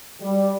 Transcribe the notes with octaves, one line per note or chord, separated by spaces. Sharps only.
G3